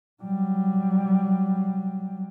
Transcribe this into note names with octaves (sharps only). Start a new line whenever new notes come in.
F#3 G3